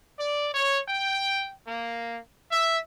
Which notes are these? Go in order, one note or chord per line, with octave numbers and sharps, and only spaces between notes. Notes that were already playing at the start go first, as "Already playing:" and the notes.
D5
C#5
G5
A#3
E5